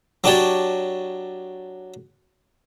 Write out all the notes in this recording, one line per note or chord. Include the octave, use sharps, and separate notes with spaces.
F#3 D4 F#4 G4 C#5 A5